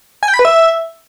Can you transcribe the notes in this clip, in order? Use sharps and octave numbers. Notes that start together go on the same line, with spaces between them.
G#5
G5
B5
B4
E5